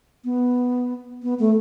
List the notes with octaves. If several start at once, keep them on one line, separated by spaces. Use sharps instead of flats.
B3
B3
A3